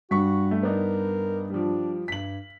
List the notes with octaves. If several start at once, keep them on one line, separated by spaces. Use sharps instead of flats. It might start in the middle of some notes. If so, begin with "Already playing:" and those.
G2 F#4 C#6 B6
A3
B3 D4 D#4 A#4
F3 G3 D4
G2 B6 F#7